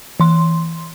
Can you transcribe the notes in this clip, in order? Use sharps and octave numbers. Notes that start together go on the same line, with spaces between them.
E3 C6